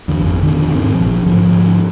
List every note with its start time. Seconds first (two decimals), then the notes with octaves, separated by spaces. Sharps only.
0.08 E2 D3
0.21 G#1 F2
0.42 F2 B2 D3 D#3
0.74 E2 G#2 C4
0.95 A1 A#2 F3
1.26 G#2 D3 F3